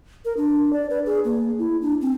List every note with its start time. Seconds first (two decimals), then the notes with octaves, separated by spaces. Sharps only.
0.25 A#4
0.37 D4
0.73 D5
0.90 B4
1.06 G#4
1.25 A#3
1.58 E4
1.82 D4
2.01 C4